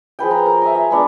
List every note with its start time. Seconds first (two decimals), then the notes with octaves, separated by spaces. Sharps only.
0.19 F3 G#4 B4 G5
0.31 A#5
0.46 A#4
0.62 E5 G#5 A#5
0.75 E5
0.91 G#3 B3 D4